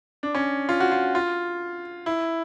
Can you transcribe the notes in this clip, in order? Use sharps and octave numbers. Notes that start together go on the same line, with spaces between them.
D4
C#4
F4
F#4
F4
F4
E4